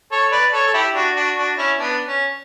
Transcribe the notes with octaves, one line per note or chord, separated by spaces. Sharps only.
A4 C#5
B4 D5
A4 C#5
A4
E4 G4
D4 F#4
D4 F#4
D4 F#4
C#4 E4
B3 D4
C#4